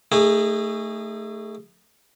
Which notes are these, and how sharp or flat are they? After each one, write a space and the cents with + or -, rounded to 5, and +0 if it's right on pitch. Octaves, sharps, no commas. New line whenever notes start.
A3 +15 D#4 +0 G#4 -25